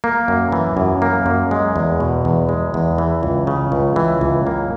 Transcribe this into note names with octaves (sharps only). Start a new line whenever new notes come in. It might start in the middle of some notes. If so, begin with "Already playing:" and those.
A#3
F#2
E3
F#2
A#3
F#2
G#3
E2
B2
E2
G#3
E2
E3
C#2
C#3
C#2
E3
C#2
A#3